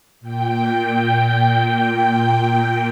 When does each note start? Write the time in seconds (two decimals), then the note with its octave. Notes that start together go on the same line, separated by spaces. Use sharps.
0.20 A#2 G5